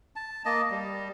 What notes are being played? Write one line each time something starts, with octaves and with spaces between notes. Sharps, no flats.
A5
A#3 D#5 A5
G3